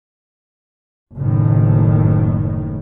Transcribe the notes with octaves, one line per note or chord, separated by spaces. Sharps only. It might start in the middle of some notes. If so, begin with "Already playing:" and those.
F#1 A2 D#3